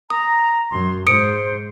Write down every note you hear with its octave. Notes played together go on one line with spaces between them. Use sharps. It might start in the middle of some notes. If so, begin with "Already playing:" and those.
A#5 D#6
F#2 C6
G#2 C5 D#6 C#7 D7